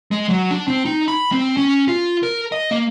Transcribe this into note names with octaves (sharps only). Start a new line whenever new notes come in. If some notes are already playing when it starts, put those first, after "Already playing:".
G#3
F#3
D4
C4
D#4
B5
C4
C#4
F4
A#4
D#5
A#3